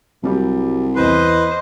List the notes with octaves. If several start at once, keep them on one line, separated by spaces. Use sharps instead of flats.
C2 F#3 G3 G4
E2 E3 B4 C5 D#5